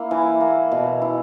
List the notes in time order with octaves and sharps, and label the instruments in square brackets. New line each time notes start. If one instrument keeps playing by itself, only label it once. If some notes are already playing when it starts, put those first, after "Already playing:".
Already playing: [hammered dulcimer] A#3 E4
E3
A#3
B2
E4